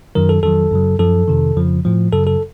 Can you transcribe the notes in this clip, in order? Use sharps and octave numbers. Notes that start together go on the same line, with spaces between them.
F#2 D#3 F#3 A#4
A4
F2 D#3 F#3 A4
F#2 C#3 F#3
F#2 F3 A4
F2 C3 D#3
F2 C#3 F3
A2 F3
F#2 C#3 F#3 A4
A4